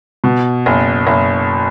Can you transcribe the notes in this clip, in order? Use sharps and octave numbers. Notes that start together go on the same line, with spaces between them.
B2
F#1
F#1